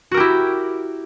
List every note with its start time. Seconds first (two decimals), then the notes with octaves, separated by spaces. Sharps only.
0.11 F#4
0.14 A#4
0.17 G4
0.20 E4